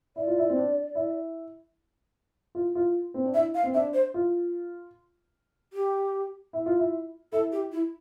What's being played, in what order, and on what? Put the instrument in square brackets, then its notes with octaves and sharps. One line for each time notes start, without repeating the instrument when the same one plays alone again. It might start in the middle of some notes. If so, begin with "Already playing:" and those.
[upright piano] E4 [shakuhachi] D5
[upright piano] F4
E4
C4
D4
E4
F4
F4
C4
D4
[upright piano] E4 [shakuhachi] E5
[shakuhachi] F5
[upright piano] C4
[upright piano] D4 [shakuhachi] E5
[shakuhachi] C5
[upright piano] F4
[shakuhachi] G4
[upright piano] E4
F4
E4
[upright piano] E4 [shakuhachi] A4
[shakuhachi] G4
E4